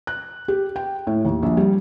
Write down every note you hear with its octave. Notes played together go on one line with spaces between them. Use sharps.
F#6
G4
G5
A2
D#2
A#1
G3